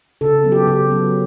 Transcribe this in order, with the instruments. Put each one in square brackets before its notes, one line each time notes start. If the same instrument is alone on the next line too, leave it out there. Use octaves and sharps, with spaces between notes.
[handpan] C#3 A4
F#3 B3
G4
C#3 G4
F#3 B3